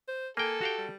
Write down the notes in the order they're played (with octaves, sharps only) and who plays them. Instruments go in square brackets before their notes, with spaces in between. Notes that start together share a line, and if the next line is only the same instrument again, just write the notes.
[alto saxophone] C5
[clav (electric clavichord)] A#3 G5 [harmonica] A4 [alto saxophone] G#5
[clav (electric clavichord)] F#4 F5 G5 [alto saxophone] G4
[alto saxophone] G3